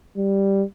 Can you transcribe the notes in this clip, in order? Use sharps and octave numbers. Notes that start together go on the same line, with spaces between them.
G3